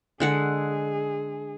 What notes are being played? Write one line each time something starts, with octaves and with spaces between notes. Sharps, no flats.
D3 G#3 G#4 F#5